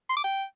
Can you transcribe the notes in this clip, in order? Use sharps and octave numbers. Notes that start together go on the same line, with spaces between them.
C6
D6
G5